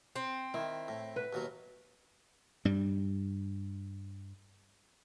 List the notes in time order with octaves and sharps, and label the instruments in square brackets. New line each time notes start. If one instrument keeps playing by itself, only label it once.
[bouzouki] C4
[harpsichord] D#3 [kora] E4
[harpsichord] A2
[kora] B4
[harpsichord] D#2 B2 F#3
[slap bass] G2 G3